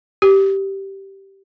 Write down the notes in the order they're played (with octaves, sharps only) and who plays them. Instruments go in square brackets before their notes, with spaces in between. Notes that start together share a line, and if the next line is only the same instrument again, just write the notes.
[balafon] G4